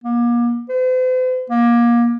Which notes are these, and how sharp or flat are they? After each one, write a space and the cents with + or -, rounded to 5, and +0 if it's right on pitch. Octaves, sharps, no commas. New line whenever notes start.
A#3 +40
C5 -45
A#3 +25